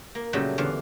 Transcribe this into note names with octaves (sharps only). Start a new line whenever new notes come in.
A#3
A#2 C#3 F#3 G3 A3
E2 D3 E3 F5